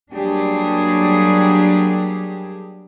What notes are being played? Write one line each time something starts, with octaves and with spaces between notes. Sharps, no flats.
F#3 G3 A#3 D4 G4 G#4